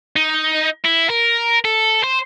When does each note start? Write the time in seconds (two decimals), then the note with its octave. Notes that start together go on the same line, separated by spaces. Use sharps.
0.16 D#4
0.85 E4
1.09 A#4
1.65 A4
2.04 C5